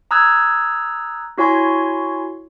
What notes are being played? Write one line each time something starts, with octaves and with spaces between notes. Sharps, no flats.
A#5 D#6 E6 F#6 G#6
E4 F#4 C#5 G#5 C6